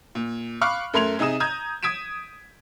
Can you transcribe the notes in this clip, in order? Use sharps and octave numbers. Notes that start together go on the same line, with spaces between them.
A#2
F5 B5 C#6 D6 F6 F#6
F#2 A3 A#4 C6 G#6 F7
C3 D#4 G#4 D#6 E7
A#5 D#6 G6 G#6
D#6 G#6 B6 D7 E7